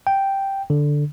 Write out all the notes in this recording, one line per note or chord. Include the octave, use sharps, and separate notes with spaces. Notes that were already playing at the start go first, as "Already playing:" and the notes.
G5
D3